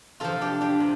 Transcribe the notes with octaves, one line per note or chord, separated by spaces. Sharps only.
C3 F3 F4 A4
D4 G4
D4 G4
C3